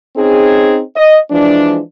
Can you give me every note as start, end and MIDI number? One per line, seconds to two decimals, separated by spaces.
0.16 0.79 60
0.16 0.79 61
0.16 0.79 63
0.16 0.79 68
0.95 1.16 75
1.31 1.79 52
1.31 1.79 53
1.31 1.79 56
1.31 1.79 62